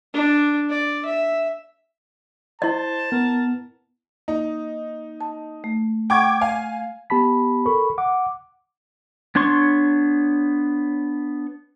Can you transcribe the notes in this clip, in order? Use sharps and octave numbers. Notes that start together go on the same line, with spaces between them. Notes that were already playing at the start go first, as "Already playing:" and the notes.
D4
D5
E5
E4 C5 D#5 A5
B3 A#4
A#3 D#4
A5
A3
F#5 G5 C#6 D6 G#6
F5 G#5
B3 G4 A5 B5 B6
A4 A#4 B5 C#6
F#5 D6
B3 D4 C#5 C6 C#6